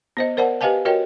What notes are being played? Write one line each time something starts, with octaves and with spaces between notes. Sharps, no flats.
B3 C5 D#5
A#4 C5 D5 F#5 A5
G4 B4 D#5 F5 G#5 A5
F#4 A#4 C#5 D#5 G5